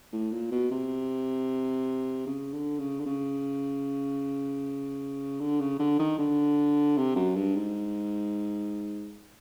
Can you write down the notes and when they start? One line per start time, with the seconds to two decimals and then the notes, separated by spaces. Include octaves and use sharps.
0.13 A2
0.32 A#2
0.52 B2
0.71 C3
2.27 C#3
2.53 D3
2.79 C#3
3.00 D3
3.06 C#3
5.41 D3
5.60 C#3
5.79 D3
5.99 D#3
6.19 D3
6.97 C3
7.16 F#2
7.36 G2
7.56 G#2